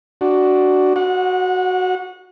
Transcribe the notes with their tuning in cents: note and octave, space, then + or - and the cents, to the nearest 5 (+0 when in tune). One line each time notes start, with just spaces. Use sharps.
D4 +0 F#4 +10
F#4 +0 F#5 -30